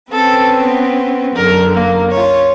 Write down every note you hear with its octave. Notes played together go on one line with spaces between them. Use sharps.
C4 C#4 A4 B4
B3
F#2 D3 A#4
A#3
C#4 F4 C#5